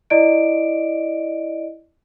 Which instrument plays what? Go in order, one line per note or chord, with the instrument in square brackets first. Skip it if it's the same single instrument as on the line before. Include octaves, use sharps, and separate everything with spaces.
[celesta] E4 D5 D#5 D7